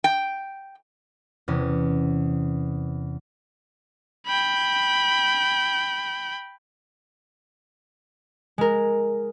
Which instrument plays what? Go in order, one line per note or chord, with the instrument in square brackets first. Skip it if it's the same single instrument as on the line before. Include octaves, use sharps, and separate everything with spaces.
[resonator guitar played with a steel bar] G5
[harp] E2 C3 C#4
[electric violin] G5 B5
[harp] G#3 A#4